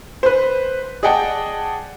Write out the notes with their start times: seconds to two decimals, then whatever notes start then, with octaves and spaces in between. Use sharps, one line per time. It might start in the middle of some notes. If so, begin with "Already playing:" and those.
0.23 B4 C5
1.03 G#4 D5 D#5 F#5 G5 A5